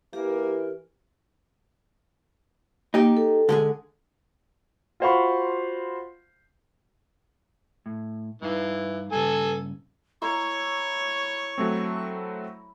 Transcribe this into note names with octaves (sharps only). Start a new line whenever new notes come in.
E3 A#3 G4 A#4
A#3 D#4 G4
A4
D3 G#3 G#4
F4 F#4 C5 F5 B5 C#6
A2
G2 E3 D#4 F5
G2 C#3 A4 G#5 E6
E4 A#4 C#5 C#6
F#3 A3 C4